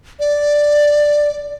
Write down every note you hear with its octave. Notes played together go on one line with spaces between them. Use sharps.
D5